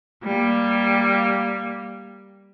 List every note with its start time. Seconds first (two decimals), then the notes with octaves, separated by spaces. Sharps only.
0.24 G3 A#3